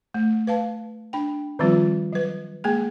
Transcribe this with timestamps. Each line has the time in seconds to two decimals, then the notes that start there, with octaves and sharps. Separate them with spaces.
0.14 A3
0.47 B4 F5 A5
1.13 D4 G5
1.59 D#3 F3 G3 C4 F4
2.13 F#3 B4
2.64 G#3 A#3 G#4 G#5